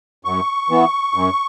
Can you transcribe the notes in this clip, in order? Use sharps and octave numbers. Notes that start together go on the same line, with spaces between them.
F#2 C#6
E3 B3
F#2